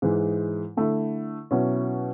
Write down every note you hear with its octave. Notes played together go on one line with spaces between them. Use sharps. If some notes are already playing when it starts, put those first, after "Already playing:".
G#2 E3 G#3
D3 A3 E4
B2 F#3 C#4 E4